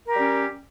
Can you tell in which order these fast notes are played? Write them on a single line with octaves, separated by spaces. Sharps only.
A#4 G4 G3 C#4